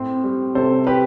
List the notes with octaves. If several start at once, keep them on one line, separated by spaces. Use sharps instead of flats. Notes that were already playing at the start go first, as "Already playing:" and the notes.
Already playing: A2 C4
G3
C3 A4 C5
G4 B4